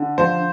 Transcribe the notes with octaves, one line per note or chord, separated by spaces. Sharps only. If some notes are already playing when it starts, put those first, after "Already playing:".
Already playing: D3
F3 C5